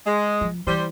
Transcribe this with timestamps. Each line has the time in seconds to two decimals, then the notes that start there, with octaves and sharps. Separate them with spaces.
0.06 G#3
0.41 F3
0.67 E3 G3 C5